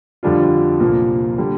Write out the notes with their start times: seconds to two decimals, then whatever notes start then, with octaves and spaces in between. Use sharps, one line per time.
0.23 F2 D3 G3 D4 F4
0.80 C2 A#2 F3 A#3
1.38 D3 G3